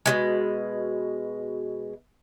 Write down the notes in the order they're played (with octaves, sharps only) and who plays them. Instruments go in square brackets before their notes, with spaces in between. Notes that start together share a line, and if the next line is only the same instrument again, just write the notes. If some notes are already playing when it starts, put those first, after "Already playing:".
[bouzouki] B2 F3 G#3